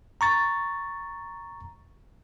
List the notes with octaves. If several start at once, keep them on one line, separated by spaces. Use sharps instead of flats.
A#5 C#6 A6